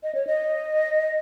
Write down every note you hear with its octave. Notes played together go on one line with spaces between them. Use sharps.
D#5
C#5
D#5